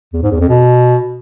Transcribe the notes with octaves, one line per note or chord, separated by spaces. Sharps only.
E2
G#2
E2
F2
B2